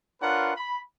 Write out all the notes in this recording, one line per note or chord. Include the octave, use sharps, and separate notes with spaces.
D4 F4 A#4 B4 C#5 F#5
B5